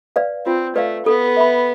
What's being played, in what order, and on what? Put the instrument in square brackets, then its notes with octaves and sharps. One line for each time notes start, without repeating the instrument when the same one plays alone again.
[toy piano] B4 D5 F5
[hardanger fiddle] C4 [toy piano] F4
[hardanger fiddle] A3 [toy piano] B4 D5 F5
[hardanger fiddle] B3 [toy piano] A4
[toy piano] E5 B5